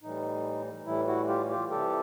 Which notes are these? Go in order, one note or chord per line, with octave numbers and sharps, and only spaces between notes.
A2 E3 G3 D#4
A2 E3 G3 E4
E4 F#4
F4 G4
F4 G4
C3 E3 G3 G4 A4